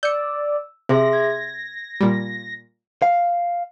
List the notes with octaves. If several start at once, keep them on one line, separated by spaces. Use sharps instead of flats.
D5 E6 G6 C#7
C3 G#4 E5 C6 A#6
G#6
A#2 G3
F5